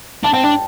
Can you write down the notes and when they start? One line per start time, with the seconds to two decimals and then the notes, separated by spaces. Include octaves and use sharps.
0.24 D4 A5
0.33 C4 G5
0.44 D4 A5